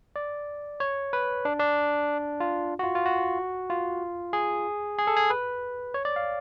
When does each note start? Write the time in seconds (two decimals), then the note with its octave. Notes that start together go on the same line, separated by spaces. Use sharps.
0.16 D5
0.80 C#5
1.13 B4
1.45 D4
1.60 D4
2.40 F4
2.79 F#4
2.84 F4
2.95 F4
3.05 F#4
3.70 F4
4.33 G#4
4.99 G#4
5.07 A4
5.16 G#4
5.30 B4
5.94 C#5
6.05 D5
6.16 F5